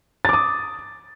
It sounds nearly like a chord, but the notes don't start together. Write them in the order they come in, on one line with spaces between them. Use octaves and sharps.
A6 D6 D#6